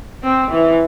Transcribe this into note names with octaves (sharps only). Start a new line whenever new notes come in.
C4
E3